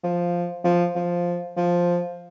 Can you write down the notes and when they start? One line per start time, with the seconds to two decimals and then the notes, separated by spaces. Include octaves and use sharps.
0.04 F3
0.65 F3
0.95 F3
1.57 F3